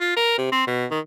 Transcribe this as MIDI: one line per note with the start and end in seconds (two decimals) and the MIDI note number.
0.01 0.12 65
0.16 0.38 70
0.38 0.49 48
0.52 0.65 60
0.67 0.85 47
0.91 0.99 51